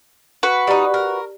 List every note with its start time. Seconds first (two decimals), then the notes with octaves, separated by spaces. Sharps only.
0.43 F#4 B4
0.67 G3 D#4
0.94 A#4